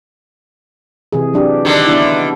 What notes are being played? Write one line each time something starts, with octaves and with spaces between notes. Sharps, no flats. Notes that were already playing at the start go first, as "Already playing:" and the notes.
C3 E3 G#4
F#3 D4 G4
D3 D#3
B3 D4 E4